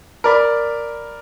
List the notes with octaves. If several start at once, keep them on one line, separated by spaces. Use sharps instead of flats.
A#4 D5 B5